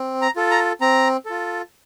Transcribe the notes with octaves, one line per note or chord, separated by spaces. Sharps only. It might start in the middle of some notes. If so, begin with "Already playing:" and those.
Already playing: C4
A#5
F4 A4
A#5
C4 A#5
F4 A4